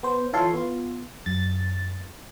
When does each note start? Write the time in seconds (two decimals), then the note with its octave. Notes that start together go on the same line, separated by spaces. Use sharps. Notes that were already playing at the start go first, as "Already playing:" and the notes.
0.03 B3 C5
0.33 E3 F4 A4 C#5 F5 C6
0.54 B3 F4
1.26 F#2 A6